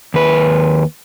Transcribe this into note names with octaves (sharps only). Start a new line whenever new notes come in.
D#2 B4